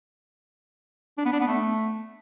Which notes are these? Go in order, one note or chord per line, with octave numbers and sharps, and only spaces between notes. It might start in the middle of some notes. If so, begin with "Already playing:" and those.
D4
B3
D4
B3
A3